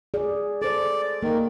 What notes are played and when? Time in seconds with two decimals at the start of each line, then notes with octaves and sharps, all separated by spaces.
0.14 G#4 D5
0.62 A4 C5 D5
1.23 D#3 A#3